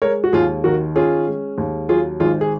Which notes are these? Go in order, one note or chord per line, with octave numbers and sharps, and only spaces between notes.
G#3 A#4 C#5
F#4
D#2 F4 G#4
D#3 F#4 A#4
C#4 F4 G#4
G#3
D#2
F#3 F4 G#4
G#1 F4 G#4
G#4